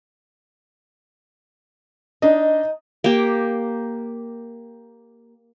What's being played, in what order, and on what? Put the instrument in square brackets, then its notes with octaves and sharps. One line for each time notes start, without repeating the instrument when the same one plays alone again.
[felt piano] D4 D#5 [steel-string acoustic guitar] D#4
[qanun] A#3 G4